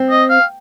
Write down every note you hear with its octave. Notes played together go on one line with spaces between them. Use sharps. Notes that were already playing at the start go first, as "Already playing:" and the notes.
Already playing: C4
D#5
F5